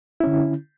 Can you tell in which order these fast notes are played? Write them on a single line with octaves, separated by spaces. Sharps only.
E4 C#4 D3